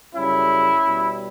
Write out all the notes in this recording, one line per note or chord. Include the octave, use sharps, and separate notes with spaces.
F#2 C#3 G3 C#4 E4
B2 G3